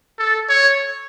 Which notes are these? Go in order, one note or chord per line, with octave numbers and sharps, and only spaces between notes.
A4
C#5